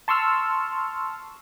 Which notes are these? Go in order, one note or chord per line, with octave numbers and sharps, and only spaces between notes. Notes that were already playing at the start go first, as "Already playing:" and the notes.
A5 C6 C#6 E6 F6